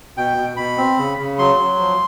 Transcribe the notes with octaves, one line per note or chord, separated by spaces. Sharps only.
B2 G5
B2
B2 B5
C4
C#3
C#3
F#3 C6
F#3
F3